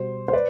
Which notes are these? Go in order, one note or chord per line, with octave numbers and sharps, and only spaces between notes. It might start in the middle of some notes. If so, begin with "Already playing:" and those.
Already playing: B2 G3 C5
C5
B4 D5